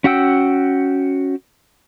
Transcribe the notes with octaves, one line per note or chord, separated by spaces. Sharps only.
C#4 F#4 F#5 G5 E6